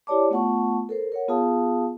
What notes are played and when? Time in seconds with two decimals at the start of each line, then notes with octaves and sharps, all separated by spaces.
0.07 E4 G4 C#5 D5 A5 D6
0.30 A3 B3 F4 F#5 A5 C#6
0.89 A4 A#4 C5
1.12 A#4 C#5 F#5
1.28 B3 F4 G#4 F5 A5 D#6